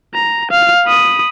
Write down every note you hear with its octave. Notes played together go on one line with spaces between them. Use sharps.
A#5
F5
B5 D#6